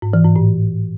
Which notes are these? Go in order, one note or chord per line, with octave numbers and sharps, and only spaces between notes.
G#2
E3
G#2
A2